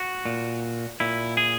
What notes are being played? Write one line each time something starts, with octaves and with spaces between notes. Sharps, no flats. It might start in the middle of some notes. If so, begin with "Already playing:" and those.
Already playing: F#4
A#2
A#2 E4
G#4